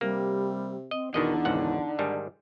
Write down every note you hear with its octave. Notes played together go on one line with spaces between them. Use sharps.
C3 G3 A#3
C4 D#5
E2 B2 D3 D#3 D#4 D#5
G#1 C#2 F#5
G#2 D#3 G3